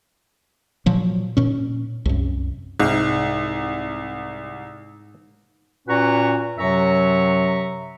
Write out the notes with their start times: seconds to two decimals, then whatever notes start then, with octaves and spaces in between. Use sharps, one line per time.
0.86 A#2 F3 F#3
1.37 A#2 C#4
2.06 C2 F#2
2.80 C2 G#2
5.88 A#2 C#4 F#4 B4 A#5 C#6
6.58 F#2 C3 F#3 E5 A#5 C#6